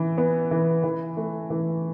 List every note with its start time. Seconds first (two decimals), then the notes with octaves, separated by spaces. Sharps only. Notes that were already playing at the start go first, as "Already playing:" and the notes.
Already playing: E3 B3
0.18 B3
0.51 E3
0.84 E3
1.17 A3
1.50 E3